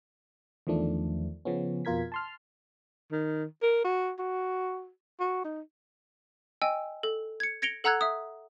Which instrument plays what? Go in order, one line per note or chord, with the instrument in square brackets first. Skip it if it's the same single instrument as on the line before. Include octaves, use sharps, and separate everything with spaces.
[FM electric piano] E2 D#3 F3 A3 D4
C#3 F3 B3 C#4
F2 B2 F4 A#4 G#6 B6
A5 C6 F6
[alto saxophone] D#3
A#4
F#4
F#4
F#4
D#4
[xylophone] D#5 G5 G#5 E6
A4
G#6 C#7
G#6 A#6 C#7 D7 F7 G7
A4 F#5 A#5 E6 F#6 G#6
E5 D#6